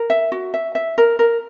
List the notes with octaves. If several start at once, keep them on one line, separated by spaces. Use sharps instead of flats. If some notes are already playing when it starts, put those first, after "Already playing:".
Already playing: A#4
E5
F#4
E5
E5
A#4
A#4